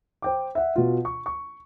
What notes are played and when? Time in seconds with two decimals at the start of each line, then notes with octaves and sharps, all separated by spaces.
0.22 C5 G5 D6
0.55 E5 F#5
0.76 B2 F4
1.05 C#6
1.26 C#6